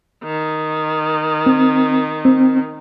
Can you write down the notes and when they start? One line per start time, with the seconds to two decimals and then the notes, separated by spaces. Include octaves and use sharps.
0.24 D#3
1.46 C4
2.25 C4